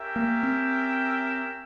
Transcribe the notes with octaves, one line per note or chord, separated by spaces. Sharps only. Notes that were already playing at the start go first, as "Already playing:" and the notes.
Already playing: C#4 G4 A#4 E5 G5
A#3
C4